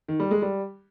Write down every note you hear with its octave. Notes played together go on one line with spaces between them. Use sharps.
D#3
G3
G#3
G3